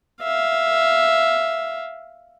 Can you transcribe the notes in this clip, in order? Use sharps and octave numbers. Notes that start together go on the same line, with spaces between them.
E5 F5